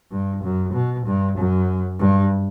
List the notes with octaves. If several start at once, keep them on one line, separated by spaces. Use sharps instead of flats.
G2
F#2
B2
G2
F#2
G2